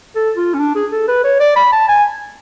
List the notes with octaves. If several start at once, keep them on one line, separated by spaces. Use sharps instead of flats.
A4
F4
C#4
D4
G#4
A4
B4
C#5
D5
B5
A5
G#5